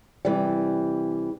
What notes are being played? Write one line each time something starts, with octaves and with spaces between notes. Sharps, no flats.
C3 E3 G3